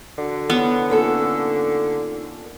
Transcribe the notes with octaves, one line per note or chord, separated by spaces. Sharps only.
D3 F#4
B3 E4 C#5
A#3 C#4 D#4 F4 A4